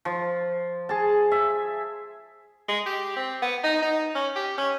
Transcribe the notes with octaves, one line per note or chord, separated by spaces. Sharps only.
F3
G#4 A5
E5
G#3
G4
C4
B3
D#4
D#4
C#4
G4
C#4